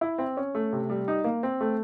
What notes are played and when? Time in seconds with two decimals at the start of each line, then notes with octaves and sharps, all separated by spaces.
0.01 E4
0.18 C4
0.37 C#4
0.55 A3
0.72 C3
0.90 G3
1.08 D#4
1.24 A#3
1.43 C4
1.61 A3